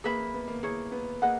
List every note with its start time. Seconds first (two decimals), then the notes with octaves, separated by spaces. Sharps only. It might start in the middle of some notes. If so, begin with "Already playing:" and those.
0.04 A#3 G#4 B4 E5 B5
0.19 A#3
0.34 B3
0.48 A#3
0.63 A#3 E4 G#4 C#5
0.92 B3
1.22 A#3 G#4 B4 D#5 F#5